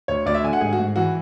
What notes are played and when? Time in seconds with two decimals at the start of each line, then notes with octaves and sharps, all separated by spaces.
0.08 D2 C#5
0.26 D2 D5
0.35 E5
0.44 D3 G#5
0.53 F#5
0.61 G#2 G#4
0.73 F#4
0.79 G#2
0.96 E3 F#4